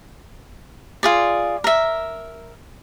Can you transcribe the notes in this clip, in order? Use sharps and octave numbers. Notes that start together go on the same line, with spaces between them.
F4 G#4 D5
A#4 E5